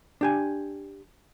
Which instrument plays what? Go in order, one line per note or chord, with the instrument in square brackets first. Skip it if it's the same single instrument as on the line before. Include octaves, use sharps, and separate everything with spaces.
[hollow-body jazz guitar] D4 G4 G#5